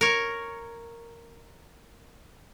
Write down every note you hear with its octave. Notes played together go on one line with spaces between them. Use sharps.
A#4 C#5